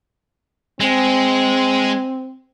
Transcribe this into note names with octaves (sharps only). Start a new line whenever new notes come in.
G#3 C4